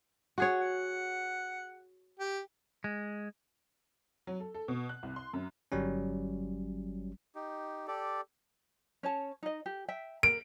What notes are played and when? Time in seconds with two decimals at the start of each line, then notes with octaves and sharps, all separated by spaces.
0.38 F#4 G#4 C#5
0.59 F#5
2.19 G4
2.84 G#3
4.27 F#3
4.40 A4
4.54 A4
4.68 B2
4.89 F#6
5.03 C2
5.16 C6
5.33 F#2
5.72 G1 F#3 G3 C#4
7.35 D#4 G4
7.88 G4 A4 D5
9.03 C#4 C#5 A5
9.43 D#4 D#5
9.66 G4
9.88 E5 G5
10.23 A#4 D7